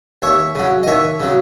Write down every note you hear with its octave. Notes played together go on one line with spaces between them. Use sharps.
D#2 C#5 E5
C#3 F#3
D#5
D#2 C#5 E5
C#3 F#3